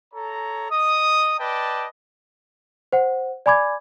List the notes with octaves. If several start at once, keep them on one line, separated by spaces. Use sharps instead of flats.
A4 C#5 A#5
D#5 D#6
B4 D5 D#5 G5 A5
C5 F#5
D5 G#5 B5 D6 G#6